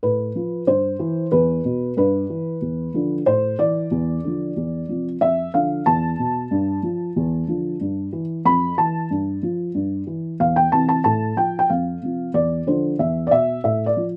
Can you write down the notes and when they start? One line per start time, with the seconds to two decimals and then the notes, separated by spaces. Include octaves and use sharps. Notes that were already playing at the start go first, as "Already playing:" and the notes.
0.03 A2 B4
0.35 F3
0.67 G2 C5
0.99 E3
1.32 E2 B4
1.65 B2
1.97 G2 B4
2.29 E3
2.62 E2
2.94 D3 F3
3.26 A2 C5
3.59 E3 D5
3.91 E2
4.24 D3 F3
4.56 E2
4.89 C3 F3
5.21 F2 E5
5.54 D3 F3 F5
5.86 E2 A5
6.19 B2
6.51 G2
6.83 F3
7.16 E2
7.48 D3 F3
7.81 G2
8.13 E3
8.45 F2 B5
8.77 E3 A5
9.10 G2
9.43 F3
9.75 G2
10.07 E3
10.40 E2 F5
10.56 G5
10.72 C3 E3 A5
10.89 A5
11.04 A2 A5
11.37 F3 G5
11.59 G5
11.70 F2 F5
12.02 C3 F3
12.34 E2 D5
12.67 D3 F3 C5
12.99 E2 E5
13.27 D5
13.31 B2 E5
13.64 A2 E5
13.86 D5
13.97 F3